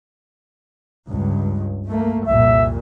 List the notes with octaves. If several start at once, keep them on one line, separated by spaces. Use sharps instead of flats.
C#2 G2
A3 A#3
C2 F2 A#2 E5